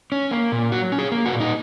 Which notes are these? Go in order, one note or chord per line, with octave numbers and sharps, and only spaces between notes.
C#4
A#3
A#2
F#3 F#4
C#4
G#4
A#3
F#4
A#2
D#4